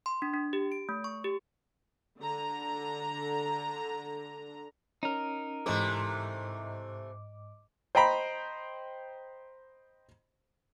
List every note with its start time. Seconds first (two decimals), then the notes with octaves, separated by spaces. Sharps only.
0.06 C6
0.22 D4
0.34 D4
0.53 G4
0.72 D7
0.89 A3
1.04 C#6
1.24 G4
2.20 D3 A#5
5.03 C#4 D#4 A#4
5.66 G#2 C3 E3 A3 D#5 D6
7.95 C5 D#5 G5 A#5 B5